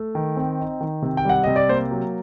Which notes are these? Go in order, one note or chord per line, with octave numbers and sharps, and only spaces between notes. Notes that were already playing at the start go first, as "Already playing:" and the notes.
Already playing: A3
D#3
C4
D#4
D#3
C3
G5
G3 F#5
C3 D#5
D5
A#3 C5
F#3